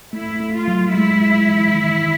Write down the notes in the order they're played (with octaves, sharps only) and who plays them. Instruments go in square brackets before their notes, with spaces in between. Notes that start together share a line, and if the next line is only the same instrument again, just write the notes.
[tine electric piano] A3 [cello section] E4
[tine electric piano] A3
[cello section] F4
[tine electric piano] F#3
[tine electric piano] G#3 [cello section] E4
[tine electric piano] G#3
E3
D#3
D#3